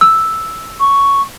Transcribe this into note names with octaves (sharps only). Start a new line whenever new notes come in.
E6
C#6